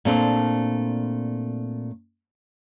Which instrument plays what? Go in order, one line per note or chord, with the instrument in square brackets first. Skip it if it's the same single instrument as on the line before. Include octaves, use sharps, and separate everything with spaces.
[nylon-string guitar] A#2 A3 C4 D4